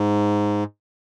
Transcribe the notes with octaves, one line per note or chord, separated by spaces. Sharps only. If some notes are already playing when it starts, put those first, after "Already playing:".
Already playing: G#2